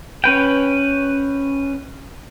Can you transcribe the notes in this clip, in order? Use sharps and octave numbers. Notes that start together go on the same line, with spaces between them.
C#4 B4 G5